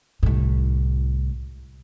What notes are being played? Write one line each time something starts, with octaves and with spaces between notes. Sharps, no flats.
C2 A2